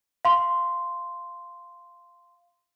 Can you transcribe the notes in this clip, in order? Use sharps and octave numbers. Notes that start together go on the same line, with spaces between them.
F5 C6